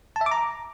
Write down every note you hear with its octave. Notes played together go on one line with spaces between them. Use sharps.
A5
E5
D6
A#5